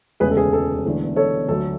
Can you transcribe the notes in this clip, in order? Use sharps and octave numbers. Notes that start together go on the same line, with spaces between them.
E1 D2 C#3 G#3 G#4 B4
A4
G#4
A4
E1 E2 D3 A3
A4 C#5
D2 D3 F#3 A3 A4